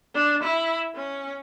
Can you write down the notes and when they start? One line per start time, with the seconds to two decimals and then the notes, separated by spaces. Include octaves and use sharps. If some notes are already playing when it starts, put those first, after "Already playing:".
0.14 D4
0.43 E4
0.95 C#4